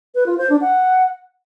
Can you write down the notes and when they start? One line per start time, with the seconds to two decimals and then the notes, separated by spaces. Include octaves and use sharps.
0.15 B4
0.26 F4
0.38 C5
0.50 D4
0.61 F#5